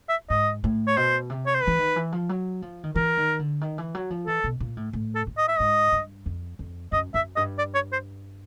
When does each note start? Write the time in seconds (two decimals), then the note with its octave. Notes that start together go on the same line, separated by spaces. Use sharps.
0.09 E5
0.30 G#2 D#5
0.64 A2
0.87 C#5
0.97 B2 C5
1.30 C3
1.46 C#5
1.54 C5
1.62 B4
1.67 E3
1.79 D#3
1.96 E3
2.12 F3
2.29 F#3
2.62 F3
2.84 D#3
2.95 E3 A#4
3.17 D#3
3.39 D3
3.61 D#3
3.78 E3
3.95 F#3
4.10 F3
4.27 E3 A4
4.44 B2
4.60 A#2
4.77 A2
4.93 A2
5.15 A4
5.27 A2
5.37 D#5
5.48 E5
5.58 G#2 D#5
5.92 G2
6.26 F2
6.59 F2
6.92 F#2 D#5
7.14 F#2 E5
7.36 G2 D#5
7.58 D5
7.74 C#5
7.92 C5